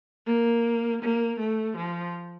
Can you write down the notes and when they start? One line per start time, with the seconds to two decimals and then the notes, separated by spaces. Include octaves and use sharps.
0.27 A#3
1.02 A#3
1.39 A3
1.77 F3